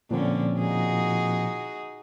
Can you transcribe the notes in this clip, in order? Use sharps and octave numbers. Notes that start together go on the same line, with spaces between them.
A#2 D3 F3 C4 C#4
D#4 F#4 G#4